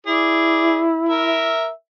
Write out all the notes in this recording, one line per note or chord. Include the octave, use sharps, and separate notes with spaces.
E4 G#4 D5
A#4 E5